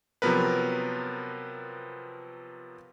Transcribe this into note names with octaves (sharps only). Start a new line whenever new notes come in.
C3 F3 F#3 B3 A#4 B4